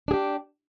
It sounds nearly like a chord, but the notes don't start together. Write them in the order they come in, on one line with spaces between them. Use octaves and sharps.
D4 G#4 G4